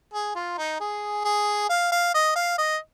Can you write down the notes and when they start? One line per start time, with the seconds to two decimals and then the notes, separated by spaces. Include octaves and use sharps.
0.14 G#4
0.35 F4
0.58 D#4
0.80 G#4
1.25 G#4
1.69 F5
1.92 F5
2.14 D#5
2.36 F5
2.58 D#5